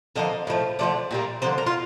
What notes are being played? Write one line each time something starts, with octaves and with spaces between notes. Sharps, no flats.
D3 F3 A#3 D#5
A2 F3 A3
D3 F3 A3 D5
A#2 G3 A#3
D3 F3 A#3 C5
A#4
F4